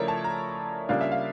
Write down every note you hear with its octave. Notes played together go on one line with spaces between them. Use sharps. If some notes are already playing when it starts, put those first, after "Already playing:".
Already playing: C#3 F3 A3 E4 A#4 C#5 D5
A5
A#5
C#3 G3 A#3 D4 F4 F5
E5
F5